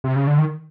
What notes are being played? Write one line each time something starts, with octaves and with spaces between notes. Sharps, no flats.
C3
C#3
D3
D#3